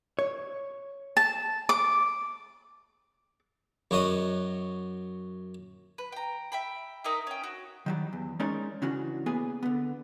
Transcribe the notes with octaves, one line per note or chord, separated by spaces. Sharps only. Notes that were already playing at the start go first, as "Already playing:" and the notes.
C#5
A5
D6
F#2 F#3 F#4 D#5 F#5 D#6
B4
G5 A#5
E5 G5 B5
D#4 A#4 D#5 E5
C#4 G5
F#4
D#3 F#3 G3
E2
G#3 C#4 D#4 A#4 C#5 D5
C#3 E3 C#4 D4 F#4
A#3 B3 G#4 B4 G#5
D3 B3